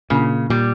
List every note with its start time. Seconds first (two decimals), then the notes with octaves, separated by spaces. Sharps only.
0.10 A#2 C#3
0.50 A#2 G3